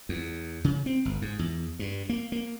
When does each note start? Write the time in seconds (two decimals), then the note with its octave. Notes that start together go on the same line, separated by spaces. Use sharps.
0.09 E2
0.64 C#3
0.86 C4
1.05 G1
1.22 G#2
1.39 E2
1.79 G2
2.09 A#3
2.32 A#3